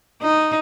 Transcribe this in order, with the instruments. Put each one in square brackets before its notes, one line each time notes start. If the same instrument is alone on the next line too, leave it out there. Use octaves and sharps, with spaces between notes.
[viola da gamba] D#4